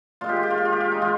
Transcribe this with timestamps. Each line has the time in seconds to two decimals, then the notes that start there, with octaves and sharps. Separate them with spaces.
0.21 A#2 G#3 F4
0.29 G4
0.36 F4
0.43 G4
0.50 F4
0.58 G4
0.65 F4
0.73 G4
0.81 F4
0.92 D#4
1.02 G#3 F4